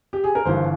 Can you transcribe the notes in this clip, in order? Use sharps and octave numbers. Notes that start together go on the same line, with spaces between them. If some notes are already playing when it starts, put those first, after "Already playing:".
G4
G#4
A#4
G1 G2 E3 C5